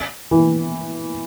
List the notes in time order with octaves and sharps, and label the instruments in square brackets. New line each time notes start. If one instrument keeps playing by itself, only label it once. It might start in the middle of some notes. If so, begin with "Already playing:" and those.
[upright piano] E3